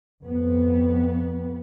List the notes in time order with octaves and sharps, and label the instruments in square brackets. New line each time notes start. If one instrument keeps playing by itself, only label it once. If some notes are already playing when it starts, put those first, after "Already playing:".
[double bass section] F2 B3